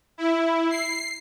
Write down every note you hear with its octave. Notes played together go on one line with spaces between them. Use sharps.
E4
C7